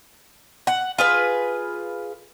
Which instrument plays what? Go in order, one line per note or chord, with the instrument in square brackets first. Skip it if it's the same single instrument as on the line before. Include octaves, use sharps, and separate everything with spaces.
[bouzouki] F#5
F4 G#4 B4